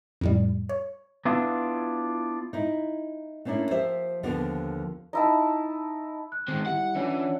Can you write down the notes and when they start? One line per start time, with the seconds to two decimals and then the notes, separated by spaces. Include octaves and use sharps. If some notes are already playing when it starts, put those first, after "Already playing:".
0.21 F2 A2 G3
0.69 C#5
1.25 B3 D4 E4 F4
2.53 D#4 E4
3.45 A3 A#3 C#4 D4 E4
3.71 F3 G4 C5 E5
4.23 D#2 D3 F3 A#3 B3 D4
5.13 D#4 E4 A5
6.32 F#6
6.48 D#3 G#3 C4 C6
6.66 G3 E4 F#5
6.96 E3 C#4 D4 F4 C#5 F#5